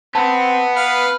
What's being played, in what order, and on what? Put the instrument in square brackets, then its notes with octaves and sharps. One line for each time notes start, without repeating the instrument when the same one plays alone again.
[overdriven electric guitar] B3 [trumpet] C4 [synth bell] A5
[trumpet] B4 [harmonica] F5